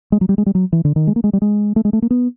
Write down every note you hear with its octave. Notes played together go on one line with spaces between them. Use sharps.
G#3
F#3
G3
G#3
G3
F#3
E3
D3
D#3
G#3
A#3
G#3
G3
G#3
A3
G#3
A3
A#3
B3